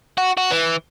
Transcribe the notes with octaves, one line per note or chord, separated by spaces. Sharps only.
F#4
F#4
E3